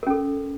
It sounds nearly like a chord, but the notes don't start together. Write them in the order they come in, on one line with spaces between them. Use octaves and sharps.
A#4 C#4 A4